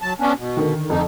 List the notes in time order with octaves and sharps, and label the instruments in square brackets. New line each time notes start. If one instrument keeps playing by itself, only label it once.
[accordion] F#3 A5
B3 C#4 D4
B2
[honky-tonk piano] D3 D#3
[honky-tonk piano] F2 [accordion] D3 D#4